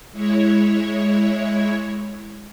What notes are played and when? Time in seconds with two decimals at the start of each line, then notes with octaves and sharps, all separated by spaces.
0.11 G#3 E4 C#5